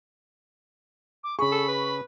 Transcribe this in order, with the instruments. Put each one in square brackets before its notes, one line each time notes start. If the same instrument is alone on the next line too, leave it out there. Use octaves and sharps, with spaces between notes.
[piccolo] D6
[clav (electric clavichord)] C#3 G#4 [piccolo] B5 [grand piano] C#6
[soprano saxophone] A4
B4